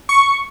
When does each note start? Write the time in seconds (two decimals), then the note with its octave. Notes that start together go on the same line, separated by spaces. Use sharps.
0.09 C#6